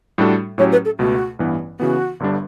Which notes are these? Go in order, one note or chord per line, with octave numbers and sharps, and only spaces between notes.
A2 G3 D4 F#4 A4
A2 F#3 C#4 G4 C#5
B4
A4
C#2 B2 A3 F#4
A1 G2 E3 B3
C#3 E3 B3 F#4
G1 G2 D3 G3 D4